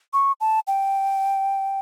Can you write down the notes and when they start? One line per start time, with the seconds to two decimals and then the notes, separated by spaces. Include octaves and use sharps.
0.13 C#6
0.41 A5
0.67 G5